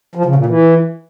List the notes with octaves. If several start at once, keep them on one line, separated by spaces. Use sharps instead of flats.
F3
C#3
A#2
E3